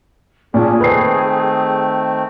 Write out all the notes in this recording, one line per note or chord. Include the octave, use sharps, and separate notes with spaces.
A#2 G3 C#4 D4 G#4
D#3 A3 C4 B4 C7